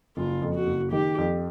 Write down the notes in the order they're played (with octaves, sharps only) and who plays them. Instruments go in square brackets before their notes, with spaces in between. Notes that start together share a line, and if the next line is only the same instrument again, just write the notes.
[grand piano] F#1 [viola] F4
[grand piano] F2
[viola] F#4
[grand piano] F#1
[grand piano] D#3 [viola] G4
[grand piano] F2